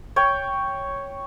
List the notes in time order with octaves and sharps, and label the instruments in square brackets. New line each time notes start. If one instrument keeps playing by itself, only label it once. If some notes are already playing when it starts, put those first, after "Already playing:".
[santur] C#5 G5